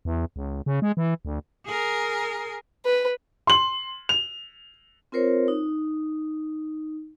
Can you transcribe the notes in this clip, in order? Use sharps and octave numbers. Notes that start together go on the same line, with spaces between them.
E2
C#2
C#3
G#3
E3
D2
G#4 A#4
B4
C6 F#7
F7
C4 F4 A#4 C5 C#5
D#4